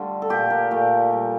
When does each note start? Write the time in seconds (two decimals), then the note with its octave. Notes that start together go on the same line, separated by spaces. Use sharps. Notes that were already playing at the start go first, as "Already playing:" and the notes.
Already playing: D3 G3 A3 F4
0.22 A4
0.30 A#2 A3 G4
0.50 A#4
0.71 A#2 A3
1.10 A#2 G3